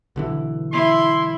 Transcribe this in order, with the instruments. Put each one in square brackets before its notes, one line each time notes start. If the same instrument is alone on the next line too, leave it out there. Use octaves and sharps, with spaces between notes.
[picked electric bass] B1 D3 E3
[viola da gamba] E4 [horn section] C6